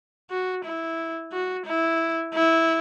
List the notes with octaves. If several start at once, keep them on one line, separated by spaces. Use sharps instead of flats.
F#4
E4
F#4
E4
E4